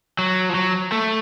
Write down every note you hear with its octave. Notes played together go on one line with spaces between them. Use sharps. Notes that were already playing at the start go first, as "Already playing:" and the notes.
F#3
F3
F#3
A3